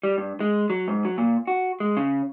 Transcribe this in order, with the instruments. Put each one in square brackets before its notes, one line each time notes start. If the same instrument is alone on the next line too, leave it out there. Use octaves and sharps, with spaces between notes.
[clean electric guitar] G3
G2
G#3
F#3
G#2
F#3
A#2
F#4
G#3
C#3